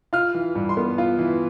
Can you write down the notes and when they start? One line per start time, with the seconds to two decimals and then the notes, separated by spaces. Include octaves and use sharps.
0.13 F4 F6
0.34 E3
0.55 G2
0.69 C6
0.77 B3
0.98 F4
1.19 E3